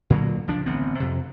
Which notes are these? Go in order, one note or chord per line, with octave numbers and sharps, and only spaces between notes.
A#2 D3 F#3 A#3
C#2 F3 D4
A1 D3 B3 C4
F2 C3